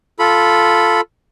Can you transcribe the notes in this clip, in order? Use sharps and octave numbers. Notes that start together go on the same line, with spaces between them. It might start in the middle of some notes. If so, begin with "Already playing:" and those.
F4 A4 B5